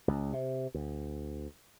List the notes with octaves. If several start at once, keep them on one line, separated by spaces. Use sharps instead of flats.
C#2
C3
D2